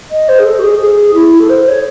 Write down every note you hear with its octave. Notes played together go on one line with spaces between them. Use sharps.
D#5
C5
G#4
A4
F#4
G#4
G#4
E4
A4
C5
C#5